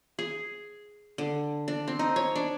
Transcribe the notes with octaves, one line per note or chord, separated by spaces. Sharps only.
G#4
D3
D4
C4
D#4
C#5
D4